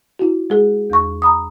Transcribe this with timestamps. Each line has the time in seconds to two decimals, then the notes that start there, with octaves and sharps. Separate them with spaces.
0.19 E4 F#4
0.50 G#3 G#4
0.90 E2 C#6
1.22 A#5 B5 D#6